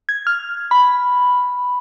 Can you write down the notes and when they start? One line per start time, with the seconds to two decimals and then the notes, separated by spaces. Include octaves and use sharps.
0.09 G#6
0.27 F6
0.71 B5